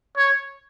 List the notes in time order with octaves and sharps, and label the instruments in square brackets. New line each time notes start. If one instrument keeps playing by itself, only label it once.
[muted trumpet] C#5